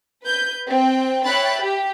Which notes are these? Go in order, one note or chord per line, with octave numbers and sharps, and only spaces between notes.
B4 G6
C4 G5
C#5 E5 G5 B5 F#6 A6
G4